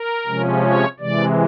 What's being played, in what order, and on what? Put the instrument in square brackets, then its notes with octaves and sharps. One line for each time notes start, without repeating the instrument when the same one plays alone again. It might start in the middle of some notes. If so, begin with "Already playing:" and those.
Already playing: [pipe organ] A#4
C3 F3 G#3 C#4
C#5
C3 E3 G#3 D5